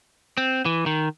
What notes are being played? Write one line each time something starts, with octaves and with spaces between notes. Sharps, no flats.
C4
E3
D#3